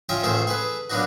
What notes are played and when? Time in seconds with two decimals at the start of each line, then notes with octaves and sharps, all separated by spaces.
0.09 C#4 F4 D#5 E5 G5
0.23 A1 D#3 A3 G#4 A4 C5
0.47 G#4 A4 B4
0.90 F#3 A#3 B3 D4 D#4 F#4